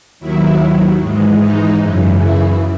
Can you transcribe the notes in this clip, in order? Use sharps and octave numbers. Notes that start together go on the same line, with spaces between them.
D#2 D#3 F#3 E4
G#2 E3 G#3
D#4
F#2 C#3 E3
E4